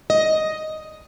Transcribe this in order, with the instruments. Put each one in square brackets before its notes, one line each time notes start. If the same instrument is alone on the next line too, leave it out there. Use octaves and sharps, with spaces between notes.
[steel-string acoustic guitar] D#5